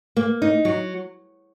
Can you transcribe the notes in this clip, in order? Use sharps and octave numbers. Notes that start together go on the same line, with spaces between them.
A#3
D#4
F#3